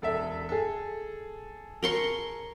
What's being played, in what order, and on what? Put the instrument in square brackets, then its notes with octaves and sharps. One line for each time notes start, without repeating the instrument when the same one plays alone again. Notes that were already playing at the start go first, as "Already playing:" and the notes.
[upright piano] E1 A4 E5
G#4 A4
[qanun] A#4 C6 C#6